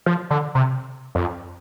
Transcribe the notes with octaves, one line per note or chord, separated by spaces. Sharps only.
F3
D3
C3
F2